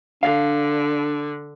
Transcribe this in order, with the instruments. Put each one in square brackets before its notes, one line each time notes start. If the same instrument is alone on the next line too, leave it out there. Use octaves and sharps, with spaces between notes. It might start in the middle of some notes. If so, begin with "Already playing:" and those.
[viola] D3 [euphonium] D4 [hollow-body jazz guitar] F5